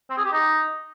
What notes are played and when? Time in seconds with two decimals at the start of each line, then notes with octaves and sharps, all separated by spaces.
0.10 C4
0.17 G#4
0.25 G4
0.32 D#4